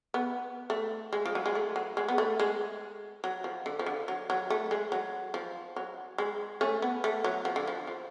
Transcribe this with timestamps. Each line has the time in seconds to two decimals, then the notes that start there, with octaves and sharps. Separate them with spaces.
0.14 B3
0.70 A3
1.13 G#3
1.26 F3
1.35 F#3
1.46 G#3
1.55 A3
1.76 F#3
1.97 G#3
2.08 B3
2.18 A3
2.39 G#3
3.24 F#3
3.44 F3
3.66 D3
3.79 F3
3.86 D3
4.08 F#3
4.30 F#3
4.50 A3
4.71 G#3
4.92 F#3
5.34 F3
5.76 F#3
6.18 G#3
6.61 A3 C#4
6.82 B3
7.04 A3
7.24 F#3
7.45 F3
7.56 D3
7.67 F3
7.87 F3